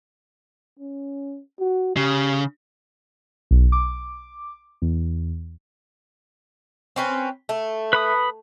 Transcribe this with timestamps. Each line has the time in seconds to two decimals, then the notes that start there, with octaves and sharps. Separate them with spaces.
0.79 C#4
1.60 F#4
1.96 C#3 G4
3.51 B1
3.72 D6
4.82 E2
6.96 C4 C#4 B4
7.49 A3
7.93 B4 B5 D#6